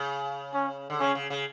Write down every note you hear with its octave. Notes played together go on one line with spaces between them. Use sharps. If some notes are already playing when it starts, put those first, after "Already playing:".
Already playing: C#3
C#4
D3
C#3 C#4
C#3
C#3